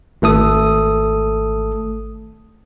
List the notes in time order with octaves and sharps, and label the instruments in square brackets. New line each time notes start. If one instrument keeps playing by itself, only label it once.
[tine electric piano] G#1 A3 A4 D#6